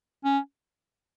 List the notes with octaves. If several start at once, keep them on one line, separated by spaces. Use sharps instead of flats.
C#4